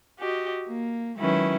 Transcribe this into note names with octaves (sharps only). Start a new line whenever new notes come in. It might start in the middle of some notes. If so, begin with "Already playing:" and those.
F#4 G4 D#5
A#3
D#3 F#3 G#3 C#4 E4 B4